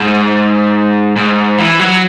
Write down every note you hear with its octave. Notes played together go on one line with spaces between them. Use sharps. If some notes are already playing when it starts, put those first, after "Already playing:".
Already playing: G#2
G#2
E3
F#3